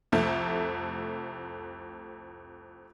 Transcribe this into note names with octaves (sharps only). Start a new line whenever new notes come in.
C2 F2 A3